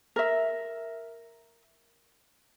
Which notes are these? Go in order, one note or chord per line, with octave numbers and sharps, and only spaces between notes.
A#4 E5